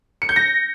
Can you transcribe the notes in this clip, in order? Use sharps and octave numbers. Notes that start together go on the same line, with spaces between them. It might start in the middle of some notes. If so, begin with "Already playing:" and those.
C#7
G6
A#6